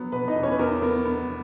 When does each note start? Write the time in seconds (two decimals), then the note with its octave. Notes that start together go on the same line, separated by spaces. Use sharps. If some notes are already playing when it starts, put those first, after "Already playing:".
Already playing: F#3 B3
0.12 B2 B3 B4
0.28 D#4 D#5
0.36 E2
0.43 C#4 C#5
0.52 B4
0.59 E2 A#4
0.82 B3 A#4
1.05 B3